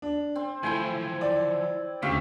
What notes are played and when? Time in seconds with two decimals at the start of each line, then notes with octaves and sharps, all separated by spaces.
0.02 D4
0.36 C4
0.63 E3 F3 A3 E4 G5 G#5
1.21 D5
2.02 D2 C#3 G4 E5 F5 C#6